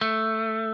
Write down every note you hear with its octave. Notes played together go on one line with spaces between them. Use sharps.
A3